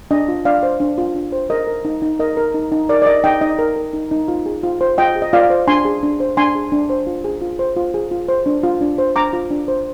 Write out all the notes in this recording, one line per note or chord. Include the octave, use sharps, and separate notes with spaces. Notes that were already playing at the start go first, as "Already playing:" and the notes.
D4 D#5
F4
D4 D5 F5
C5
D4
F4
D4
C5
A#4 D#5
A#4
D#4
D#4
A#4 D#5
A#4
D#4
D#4
A#4 D5
D5
A#4 D#5
D#4 D#5 G5
D#4 D#5
A#4
A#4
D#4
D#4
F4
G#4
F4
C5
F4 D#5 G5
G#4
D#5
F4 D5 F5
C5
D4 G#5 C6
G#4
D4
C5
D4 G#5 C6
G#4
D4
C5
F4
G#4
F4
C5
F4
G#4
F4
C5
D4
F4
D4
C5
D4 A#5 D6
F4
D4
C5